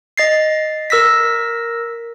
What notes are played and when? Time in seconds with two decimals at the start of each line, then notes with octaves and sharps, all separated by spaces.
0.17 D#5 A6 C7
0.90 A#4 E6 A#6 B6